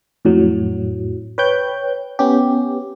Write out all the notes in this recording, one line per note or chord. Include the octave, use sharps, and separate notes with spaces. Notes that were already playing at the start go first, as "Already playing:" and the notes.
F2 A2 F#3
B4 C#5 G5 G6
B3 C#4 G4